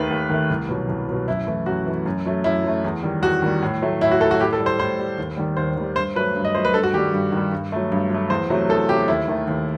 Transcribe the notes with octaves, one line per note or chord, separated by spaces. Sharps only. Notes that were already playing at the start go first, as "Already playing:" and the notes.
Already playing: D#2 D#3 A3 B4
D#2
D#3 A3
C2
B2 F#3
C2
B2 F#3
F#2 E4
E3 A3
F#2 F#4
E3 A3
F#2
F#3 A3
F#2 E4
F#3 A3
E2
D#3 G3
E2 F#4
D#3 G3
A2
F#3 A3
A2 E4
F#4
F#3 A3 A4
F#4
A2 G4
A4
G3
C5
A2 C5
G3
D#2
D#3 G3
D#2 C5
D#3 G3
G2 C5
F#3 A3 B4
G2
D#5
F#3 A3 C5
B4
G2 A4
F#4
D#3 G3 G4
G2
D#3 G3
G2
F#3 A3
G2
F#3 A3
E2 C5
C3 F#3 A3
E2 A4
C3 F#3 A3 G4
D#2 E4
D#3 A3
D#2